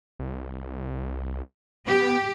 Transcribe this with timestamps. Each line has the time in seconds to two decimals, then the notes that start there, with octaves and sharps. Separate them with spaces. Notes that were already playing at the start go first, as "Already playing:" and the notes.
0.19 C2
1.88 B3 G4